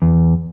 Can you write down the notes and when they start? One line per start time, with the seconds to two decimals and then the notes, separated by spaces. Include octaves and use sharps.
0.02 E2